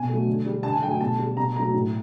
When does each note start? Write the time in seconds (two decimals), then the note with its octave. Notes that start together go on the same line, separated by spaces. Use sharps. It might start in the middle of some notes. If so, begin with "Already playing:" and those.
Already playing: B2 G#5
0.09 F#3 A3
0.27 D3
0.46 G3
0.63 D3 A5
0.72 G#5
0.82 F#3 A3 G5
0.91 G#5
1.01 B2 A5
1.19 G3
1.37 B2 A#5
1.55 F#3 A3 A#5
1.74 A2